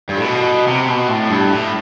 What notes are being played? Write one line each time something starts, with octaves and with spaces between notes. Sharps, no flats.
G2
A2
B2
C3
B2
A2
G2
A2